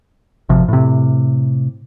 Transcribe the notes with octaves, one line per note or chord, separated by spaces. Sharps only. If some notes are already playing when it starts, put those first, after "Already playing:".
G#1 C3 F3
A2 C3